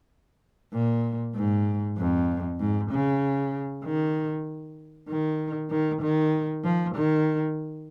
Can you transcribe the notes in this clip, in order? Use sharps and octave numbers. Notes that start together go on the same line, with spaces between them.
A#2
G#2
F2
G#2
C#3
D#3
D#3
D#3
D#3
F3
D#3